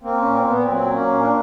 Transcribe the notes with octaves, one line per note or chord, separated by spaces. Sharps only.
A#3 C4
C#4
A#2
C4
A#2 B3
C4
F#3
C4
A#3 C#4
C#4
A#2
D4